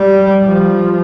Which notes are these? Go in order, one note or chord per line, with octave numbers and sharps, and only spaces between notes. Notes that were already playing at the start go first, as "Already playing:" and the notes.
Already playing: G3
F3